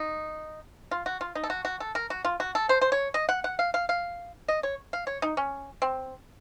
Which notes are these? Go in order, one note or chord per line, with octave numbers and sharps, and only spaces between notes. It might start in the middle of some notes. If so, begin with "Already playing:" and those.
Already playing: D#4
F4
F#4
F4
D#4
A4
F#4
F#4
A4
A#4
F#4
F4
F#4
A4
C5
C5
C#5
D#5
F#5
F#5
F5
F5
F5
D#5
C#5
F5
C#5
D#4
C#4
C4